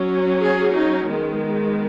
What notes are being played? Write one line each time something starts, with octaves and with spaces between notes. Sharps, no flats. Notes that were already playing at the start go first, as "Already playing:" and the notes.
Already playing: F#3 C#4
G#4
D#4
D#3 G#3 B3